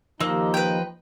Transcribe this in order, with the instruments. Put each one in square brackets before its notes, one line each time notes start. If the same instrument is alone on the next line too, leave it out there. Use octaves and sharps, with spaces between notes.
[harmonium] D#2 D#4 [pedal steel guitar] F3 D#5 E6 [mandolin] A#3
[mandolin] B4 G5